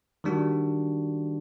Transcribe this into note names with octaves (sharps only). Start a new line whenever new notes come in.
D#3 G3 D4 F#4